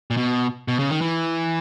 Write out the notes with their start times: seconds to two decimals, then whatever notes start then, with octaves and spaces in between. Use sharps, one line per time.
0.11 A#2
0.17 B2
0.68 B2
0.79 C#3
0.91 D#3
1.01 E3